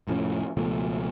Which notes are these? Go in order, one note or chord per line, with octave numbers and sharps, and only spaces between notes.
F1 A2 F3 C#4
C#2 B2 F3 A3